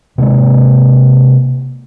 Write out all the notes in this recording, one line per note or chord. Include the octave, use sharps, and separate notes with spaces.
C3 G#3 A#3